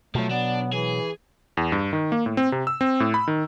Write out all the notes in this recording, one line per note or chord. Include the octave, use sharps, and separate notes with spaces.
B2 F3 F#3 A3
B3 D4
E3 G#4
E2
G2
D#3
A#3
A2
C4
C3
E6
C4
A2
B5
D#3